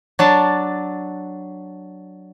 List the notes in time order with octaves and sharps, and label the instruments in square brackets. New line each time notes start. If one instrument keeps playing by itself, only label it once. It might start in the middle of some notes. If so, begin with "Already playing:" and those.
[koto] F#3 D4 A5